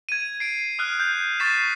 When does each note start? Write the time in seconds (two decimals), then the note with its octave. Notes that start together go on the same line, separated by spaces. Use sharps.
0.09 G#6 D#7
0.40 C7 D7
0.79 D#6 F6 F#6
1.00 G6
1.40 C#6 G6 A6 B6 C7 E7